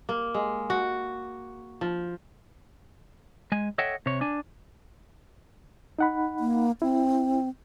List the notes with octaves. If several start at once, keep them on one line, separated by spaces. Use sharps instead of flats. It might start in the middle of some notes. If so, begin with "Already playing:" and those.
A#3
G#3
F#4
F3
G#3 G#5
A4 C#5 D#5 E5 F#5 G5
C3 C#5
D4 G#5
D#4 F#5 B5
A#3
C4 E4